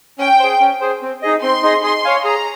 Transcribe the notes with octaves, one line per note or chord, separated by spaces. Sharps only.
C#4 G5
G#4 C5
C#4
G#4 C5
C4
D#4 G#4 D#5
C4 C6
D#4 G#4 D#5
G#4 C6
C#5 F5 G#5
G#4 A#5